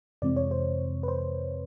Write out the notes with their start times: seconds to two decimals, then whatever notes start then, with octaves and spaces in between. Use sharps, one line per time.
0.22 F2 C3 E3 G#3 C4 D5
0.36 C#5
0.51 C5
1.03 B4
1.08 C5